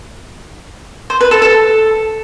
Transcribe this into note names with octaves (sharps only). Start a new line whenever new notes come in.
C5
B4
A4
A4